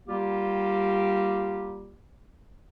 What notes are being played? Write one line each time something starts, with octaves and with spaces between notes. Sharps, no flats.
G3 A#3 F4 G4